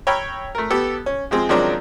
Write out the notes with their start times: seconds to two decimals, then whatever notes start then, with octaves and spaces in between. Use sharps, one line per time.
0.07 C#5 G5 A#5 B5 E6 F6
0.55 A3 A#4
0.70 B3 G4 A4
1.06 C#4
1.31 F3 G#3 C4 G#4
1.49 D#3 F3 F#3 G#3 C4 D4